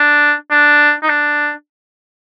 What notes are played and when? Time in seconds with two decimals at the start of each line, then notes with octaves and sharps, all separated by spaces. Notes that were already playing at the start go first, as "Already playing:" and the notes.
Already playing: D4
0.50 D4
1.03 D#4
1.09 D4